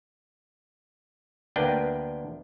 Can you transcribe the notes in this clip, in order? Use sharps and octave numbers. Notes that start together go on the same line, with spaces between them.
D2 A#3 B3 D4 B4 G5